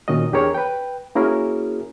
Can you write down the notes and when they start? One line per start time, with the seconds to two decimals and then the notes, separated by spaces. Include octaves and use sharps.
0.08 A#2 D#3 C#4 F#4 D#5
0.32 E2 D4 G4 G#4 A#4 C#5
0.54 B4 G5
1.15 A#3 C#4 E4 F#4 G#4 A#4